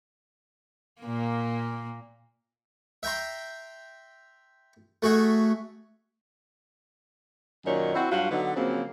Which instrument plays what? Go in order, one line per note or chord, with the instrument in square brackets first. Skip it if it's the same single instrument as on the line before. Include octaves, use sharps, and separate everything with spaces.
[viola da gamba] A#2 A#3
[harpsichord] E5 G5 A#5 C6
A3 F#4 G#4 E5
[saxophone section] F#2 A#2 D#3 C#5
C4 E4 F#4
G2 F#3 F4 F#4
D3 F#3 B3 D#4
C#3 F3 F#3 A#3 C4